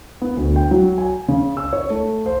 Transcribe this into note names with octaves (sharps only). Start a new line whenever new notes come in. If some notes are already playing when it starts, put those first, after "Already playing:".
B3
D2
G5
F#3
G#5
C#3
E6
C#5
A3
C5